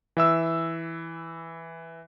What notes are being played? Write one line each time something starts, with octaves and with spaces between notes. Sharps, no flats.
E3 E5 E6